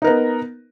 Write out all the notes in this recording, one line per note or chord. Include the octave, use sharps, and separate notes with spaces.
B3 D#4 A#4